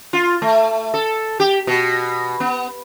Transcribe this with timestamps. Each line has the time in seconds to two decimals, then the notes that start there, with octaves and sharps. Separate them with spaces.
0.13 F4
0.42 A3
0.94 A4
1.40 G4
1.67 B2
2.40 B3